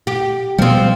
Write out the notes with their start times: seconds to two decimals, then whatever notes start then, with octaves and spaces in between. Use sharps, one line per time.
0.07 G4
0.59 B2 F3 G3 C4